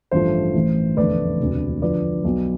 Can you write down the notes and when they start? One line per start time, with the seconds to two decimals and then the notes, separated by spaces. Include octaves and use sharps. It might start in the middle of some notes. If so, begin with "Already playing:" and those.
0.11 A1 G2 F3 A3 C5
0.54 A1 A2 E3
0.96 F1 E2 D3 A3 B4 D5
1.40 E1 D2 C3
1.82 F2 D3 F3 B4 D5
2.24 B1 B2 B3